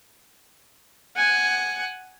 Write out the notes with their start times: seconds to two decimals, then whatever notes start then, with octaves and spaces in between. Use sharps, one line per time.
1.16 F#5 G#5